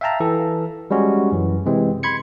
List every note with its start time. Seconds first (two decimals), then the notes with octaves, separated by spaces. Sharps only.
0.01 E5 F5 G5 A5 A#5
0.20 E3 A4
0.91 G3 G#3 C#4 F#4
1.32 F#2 E3
1.66 C3 E3 G#3 C4
2.03 B5 C6 G#6 C#7